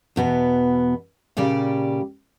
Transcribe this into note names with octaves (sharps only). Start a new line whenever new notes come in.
E2 B2 B3
A#2 C#3 G3 G4 D5